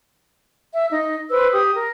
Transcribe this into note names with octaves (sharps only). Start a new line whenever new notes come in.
E5
D#4
B4 C5 E6
G4 D#6
A#4